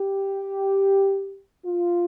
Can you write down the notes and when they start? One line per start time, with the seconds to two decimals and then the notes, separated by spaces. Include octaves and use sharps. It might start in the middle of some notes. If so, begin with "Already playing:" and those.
Already playing: G4
1.65 F4